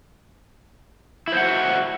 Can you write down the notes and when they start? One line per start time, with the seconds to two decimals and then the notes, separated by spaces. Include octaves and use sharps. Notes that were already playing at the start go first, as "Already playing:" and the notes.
1.28 E4
1.32 C5
1.37 F#5
1.41 F#4